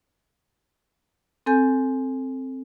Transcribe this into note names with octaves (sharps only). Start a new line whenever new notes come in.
C4 A4 G#5 G6